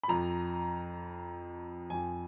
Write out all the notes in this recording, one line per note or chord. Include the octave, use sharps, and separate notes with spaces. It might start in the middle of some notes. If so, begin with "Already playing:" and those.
B5
F2 F3 A#5
F2 F3 G#5